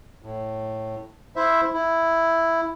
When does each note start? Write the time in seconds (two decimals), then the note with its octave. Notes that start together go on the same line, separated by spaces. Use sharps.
0.22 A2
1.36 E4 C5 E5
1.73 E4